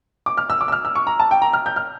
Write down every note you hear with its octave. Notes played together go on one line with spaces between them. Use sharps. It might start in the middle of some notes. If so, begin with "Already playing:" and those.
D6
F6
E6
D6
E6
F6
E6
C#6
A#5
A5
G5
A#5
F6
G6
F6